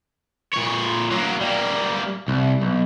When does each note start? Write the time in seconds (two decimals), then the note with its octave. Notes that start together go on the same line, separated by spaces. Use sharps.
0.54 A#2 C#5
1.11 F#3 A#3
1.41 G3 A#3
2.28 C2
2.61 B1